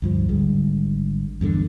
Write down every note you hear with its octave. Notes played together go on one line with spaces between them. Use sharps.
D2 G2 F3
G#1 D3 G3 G#3
E2 G2 B2 D3